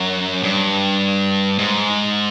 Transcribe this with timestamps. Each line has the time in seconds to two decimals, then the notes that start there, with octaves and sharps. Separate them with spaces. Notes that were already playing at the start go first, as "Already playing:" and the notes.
Already playing: F#2
0.43 G2
1.59 G#2